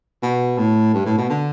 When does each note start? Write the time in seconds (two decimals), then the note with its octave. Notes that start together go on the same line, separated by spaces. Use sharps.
0.23 B2
0.58 A2
0.94 G2
1.06 A2
1.18 B2
1.29 D3